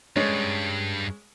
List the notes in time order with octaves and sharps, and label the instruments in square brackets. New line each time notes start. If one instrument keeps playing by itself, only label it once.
[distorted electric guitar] G2 [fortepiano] G#3 C#4